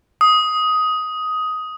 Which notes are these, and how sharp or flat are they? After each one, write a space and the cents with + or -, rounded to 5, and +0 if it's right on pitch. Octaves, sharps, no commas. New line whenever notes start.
D#6 +10